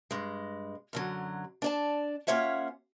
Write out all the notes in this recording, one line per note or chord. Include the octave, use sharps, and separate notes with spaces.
G2 G#3
F#2 D3 F#3
D4 D5 A5
A#3 C#4 F4 C#5 E5 F#5